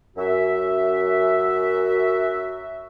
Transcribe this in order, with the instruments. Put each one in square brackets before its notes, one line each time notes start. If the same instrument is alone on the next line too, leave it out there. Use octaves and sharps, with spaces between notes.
[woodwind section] F#2 F#4 E5